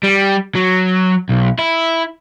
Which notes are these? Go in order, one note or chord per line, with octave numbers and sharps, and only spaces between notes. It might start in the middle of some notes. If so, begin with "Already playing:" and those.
G3
F#3
B1
E4